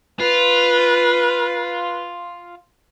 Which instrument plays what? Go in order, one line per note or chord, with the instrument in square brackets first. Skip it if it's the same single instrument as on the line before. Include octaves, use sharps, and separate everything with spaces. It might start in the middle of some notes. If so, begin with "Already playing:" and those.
[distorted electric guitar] F4 [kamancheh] B4